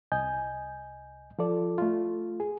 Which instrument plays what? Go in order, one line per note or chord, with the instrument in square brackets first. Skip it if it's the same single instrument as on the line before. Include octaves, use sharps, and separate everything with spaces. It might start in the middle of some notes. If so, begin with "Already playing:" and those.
[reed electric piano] C2 D#5 G#5 G6
F3 F4 A4 D5
A3 F4
G#4